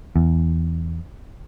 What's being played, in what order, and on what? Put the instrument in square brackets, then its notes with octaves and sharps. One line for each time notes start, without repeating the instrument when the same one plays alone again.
[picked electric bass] E2